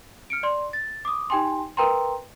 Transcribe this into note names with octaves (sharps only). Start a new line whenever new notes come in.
F6 C#7 D7
D5 C6
A6
D6 D#6
D#4 G4 G5 G#5 C6
A#4 B4 G5 A#5 C6